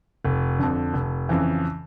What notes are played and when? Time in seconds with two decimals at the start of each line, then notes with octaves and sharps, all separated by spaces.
0.25 F1
0.59 F2 D3
0.93 F1
1.29 F2 C#3 E3